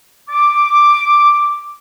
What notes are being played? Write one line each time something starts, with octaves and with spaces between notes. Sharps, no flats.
D6